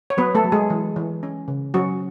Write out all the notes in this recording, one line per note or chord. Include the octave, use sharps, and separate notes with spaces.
C#5
F#3 B3 B4
A3 A4
F#3
G#3 G#4
E3
E3
C#4
C#3
F#3 C#4 F#4